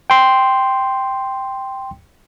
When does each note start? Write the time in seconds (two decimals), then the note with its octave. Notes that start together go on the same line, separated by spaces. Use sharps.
0.10 G5 C6